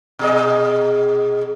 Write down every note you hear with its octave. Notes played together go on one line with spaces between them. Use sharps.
B2 G#4 D#5